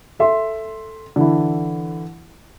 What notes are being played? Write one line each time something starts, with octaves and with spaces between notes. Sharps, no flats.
A4 E5 C6
D3 E3 E4